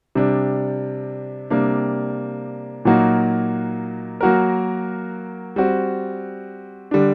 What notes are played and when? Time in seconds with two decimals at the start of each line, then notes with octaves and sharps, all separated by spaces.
0.15 C3 G3 D4
1.50 C3 G3 A#3 D4
2.85 A#2 F#3 A#3 D#4 F#4
4.21 F#3 A#3 F#4 A#4
5.56 G3 C4 F#4
6.91 D3 G3 D4